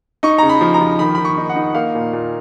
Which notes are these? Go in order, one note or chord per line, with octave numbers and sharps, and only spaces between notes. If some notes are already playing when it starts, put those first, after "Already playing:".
D#4 C#6
C#3 A#5
B5
F3
A#5
F3
D#3 B5
D#3 B5
C#6
D#4
F#5
D#4
A#3 F5
A#2
A#2